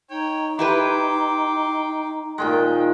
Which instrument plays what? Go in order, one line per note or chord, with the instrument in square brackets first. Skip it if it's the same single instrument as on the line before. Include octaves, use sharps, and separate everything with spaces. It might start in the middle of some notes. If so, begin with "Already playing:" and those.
[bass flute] D#4 [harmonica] C#5 G5
[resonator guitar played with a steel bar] E4 G4 B4 [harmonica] G5 C6 D6
[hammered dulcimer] A#2 D#3 G#3 [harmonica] G5